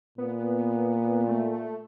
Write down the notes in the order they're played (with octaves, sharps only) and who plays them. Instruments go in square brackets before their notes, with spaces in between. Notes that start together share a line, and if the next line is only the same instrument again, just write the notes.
[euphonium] A#2 [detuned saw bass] B3
[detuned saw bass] A3